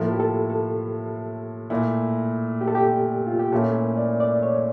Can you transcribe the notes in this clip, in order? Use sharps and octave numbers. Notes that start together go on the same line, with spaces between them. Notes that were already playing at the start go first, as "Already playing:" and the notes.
Already playing: A2 F3 A#3 E4 A4
G4
A4
A4
A#2 A3 E4
G4
A4
G4
F4
G4
A#2 A3 C#4 E4 A4
A#4
D5
D5
C#5